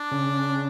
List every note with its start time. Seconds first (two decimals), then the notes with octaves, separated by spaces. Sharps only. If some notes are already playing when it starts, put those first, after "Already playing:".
Already playing: D4
0.12 C#3